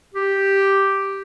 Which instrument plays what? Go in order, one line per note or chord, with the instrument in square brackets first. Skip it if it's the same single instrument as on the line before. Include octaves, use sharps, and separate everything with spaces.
[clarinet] G4